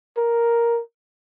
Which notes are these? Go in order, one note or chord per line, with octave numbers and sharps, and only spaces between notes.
A#4